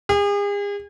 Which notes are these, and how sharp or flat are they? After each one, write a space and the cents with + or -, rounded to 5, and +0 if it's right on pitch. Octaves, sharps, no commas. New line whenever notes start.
G#4 -40